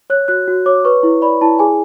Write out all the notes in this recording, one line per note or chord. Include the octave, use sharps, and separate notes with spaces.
C#5 F#6
F#4 F#6
F#4
C#5 D6
B4 C#6
E4
D5 B5
E4 A5
G#4 G#5